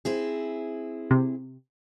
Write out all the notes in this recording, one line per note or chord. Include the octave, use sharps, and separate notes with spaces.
C4 E4 G#4
C3